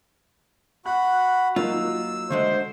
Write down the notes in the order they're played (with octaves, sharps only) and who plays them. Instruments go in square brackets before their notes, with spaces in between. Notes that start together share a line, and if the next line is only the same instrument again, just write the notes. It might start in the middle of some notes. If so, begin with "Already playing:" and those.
[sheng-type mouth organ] F#4 F#5 B5 [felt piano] F#6
[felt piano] F#3 A#3 D#4 [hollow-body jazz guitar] F4 [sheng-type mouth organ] E6
[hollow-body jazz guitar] D2 D3 G#3 [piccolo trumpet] C5